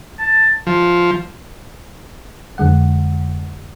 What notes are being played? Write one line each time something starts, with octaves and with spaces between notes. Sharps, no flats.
A5
F3
F2 D3 G#3 F#5